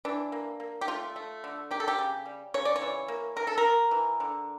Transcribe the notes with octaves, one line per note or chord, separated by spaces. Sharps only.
E3 D4
A#3
A#3
G4
A3 F4
A3
D3
A#3 G4
A4
G4
C#3
G3
C#3 C#5
D5
C#5
E3
A#3
E3 A#4
A4
A#4
A#3
E3
D3